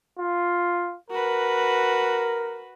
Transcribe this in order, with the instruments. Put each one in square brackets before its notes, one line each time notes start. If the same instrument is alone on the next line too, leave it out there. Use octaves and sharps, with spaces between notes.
[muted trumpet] F4
[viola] F#4 B4 [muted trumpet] A#4